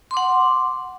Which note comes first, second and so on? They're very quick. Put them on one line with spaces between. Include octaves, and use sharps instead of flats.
C6 D6 F#5